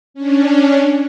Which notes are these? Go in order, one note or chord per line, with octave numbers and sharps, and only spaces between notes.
C#4 D4